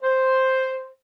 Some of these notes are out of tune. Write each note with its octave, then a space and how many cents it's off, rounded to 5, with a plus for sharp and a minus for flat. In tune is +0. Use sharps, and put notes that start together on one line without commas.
C5 +0